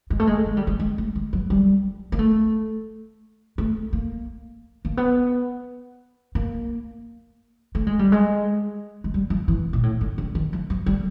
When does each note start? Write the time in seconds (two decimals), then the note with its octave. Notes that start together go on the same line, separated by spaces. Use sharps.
0.10 G#3
0.20 A3
0.27 G#3
0.46 G#3
0.57 G3
0.67 G#3
0.80 G#3
0.98 A3
1.15 G#3
1.33 F#3
1.50 G3
2.12 A#3
2.19 A3
3.58 A3
3.93 A#3
4.85 A#3
4.97 B3
6.35 A#3
7.75 A3
7.87 G#3
7.99 G3
8.12 G#3
9.04 G#3
9.14 G3
9.30 F3
9.48 E3
9.73 A#2
9.83 A2
10.01 G#2
10.18 D3
10.35 D#3
10.53 F3
10.70 F#3
10.86 G3